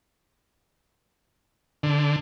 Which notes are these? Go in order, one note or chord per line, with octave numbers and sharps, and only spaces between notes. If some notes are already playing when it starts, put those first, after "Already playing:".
D3